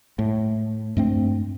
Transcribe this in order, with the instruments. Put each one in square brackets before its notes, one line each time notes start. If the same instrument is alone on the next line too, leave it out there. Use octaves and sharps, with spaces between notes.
[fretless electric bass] A2
G2 A3 C4